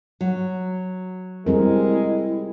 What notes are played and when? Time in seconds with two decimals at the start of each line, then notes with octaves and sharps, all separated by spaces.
0.21 F#3
1.46 G3 G#3 C4 E4 A#4